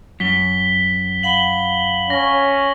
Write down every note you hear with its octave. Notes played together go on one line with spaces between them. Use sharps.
F#2 B6 G7
F5 F#5 B5 F#7 G7
C#4 A#6